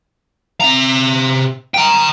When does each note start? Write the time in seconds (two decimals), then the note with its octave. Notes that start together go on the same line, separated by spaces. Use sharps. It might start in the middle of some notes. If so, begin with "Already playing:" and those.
0.60 C3 A#5
1.74 G5 A#5